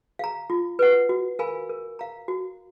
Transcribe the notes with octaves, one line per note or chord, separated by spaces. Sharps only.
F5 A#5
F4
B4 F#5
F#4
A#4 F5 G#5 B5
A#4
F5 A#5
F#4